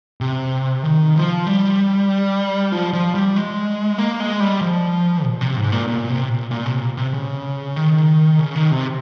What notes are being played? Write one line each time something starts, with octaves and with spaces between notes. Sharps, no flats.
C3
D#3
F3
G3
F3
F3
G3
G#3
A#3
G#3
G3
F3
A#2
C3
G#2
A#2
A#2
C3
A#2
A#2
C3
A#2
C3
C#3
D#3
C#3
D#3
C3